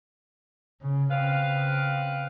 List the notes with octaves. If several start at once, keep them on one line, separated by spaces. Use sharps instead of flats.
C#3
C#3 C4 B4 F5